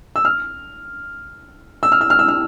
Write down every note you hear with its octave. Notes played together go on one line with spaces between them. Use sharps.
E6
F6
E6
F6
E6
F6
E6
F6